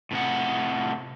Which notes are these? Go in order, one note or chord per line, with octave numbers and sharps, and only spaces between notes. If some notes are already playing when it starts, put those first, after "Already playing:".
A2 C3 F#5